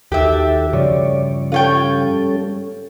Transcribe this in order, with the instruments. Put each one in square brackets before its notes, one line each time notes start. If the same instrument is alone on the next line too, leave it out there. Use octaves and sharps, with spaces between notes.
[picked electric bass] D#2 D#3 [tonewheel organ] F#4 A4 [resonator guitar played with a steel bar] G4 E5
[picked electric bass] G2 C#3 F3 [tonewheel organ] C#5 D5
[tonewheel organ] G3 C#4 A4 [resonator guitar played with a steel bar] F4 C#5 G5